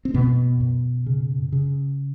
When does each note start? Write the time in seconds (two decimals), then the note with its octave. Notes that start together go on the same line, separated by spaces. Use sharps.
0.05 C4
0.14 F#2 B2 B3
0.61 F#2
1.06 C#3
1.52 C#3